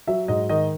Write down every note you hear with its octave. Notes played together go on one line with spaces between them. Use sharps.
F#3 E5
G#2 D#5
D#3 D#5